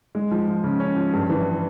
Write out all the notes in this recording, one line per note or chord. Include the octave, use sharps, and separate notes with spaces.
G#3
F3
F3
C#3
C#4
F3
G2
E3